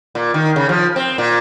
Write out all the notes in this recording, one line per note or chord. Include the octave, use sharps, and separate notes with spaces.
A#2
D#3
C#3
F3
C4
A#2